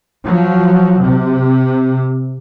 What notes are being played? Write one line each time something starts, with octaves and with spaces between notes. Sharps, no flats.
F3 F#3
C3